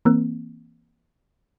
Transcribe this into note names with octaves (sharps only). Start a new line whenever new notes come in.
E3 A#3 C4